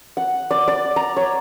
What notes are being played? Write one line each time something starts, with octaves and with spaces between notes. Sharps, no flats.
F#5
D5
D5
A#5
C#5